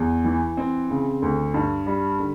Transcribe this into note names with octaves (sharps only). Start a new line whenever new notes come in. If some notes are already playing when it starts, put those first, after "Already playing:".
Already playing: E2
E3
C4
C#3
D2
G2
G3
D3